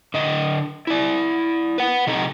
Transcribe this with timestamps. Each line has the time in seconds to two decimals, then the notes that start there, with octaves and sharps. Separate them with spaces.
0.14 D3 D#5
0.87 E4 D5
1.78 B4 F#5
2.07 C3 D#4 A4